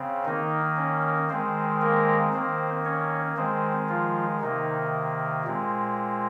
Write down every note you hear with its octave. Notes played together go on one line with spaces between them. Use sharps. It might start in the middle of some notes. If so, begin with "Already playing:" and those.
Already playing: C#3 C4
D#3 A#3 D#4
C#4
D#3 G#3 C4 C5
A#3 A#4
D#3 A#3 C4 C5
C#4 C#5
D#3 G#3 C4 C5
F3 F4
C3 D#3 A#3 D#4
A#2 G#3 C4